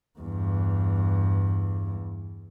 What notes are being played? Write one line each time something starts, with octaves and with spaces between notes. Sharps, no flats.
E2 G2